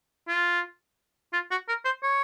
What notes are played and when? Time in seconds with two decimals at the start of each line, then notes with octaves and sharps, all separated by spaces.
0.28 F4
1.33 F4
1.51 F#4
1.68 A#4
1.85 C5
2.03 C#5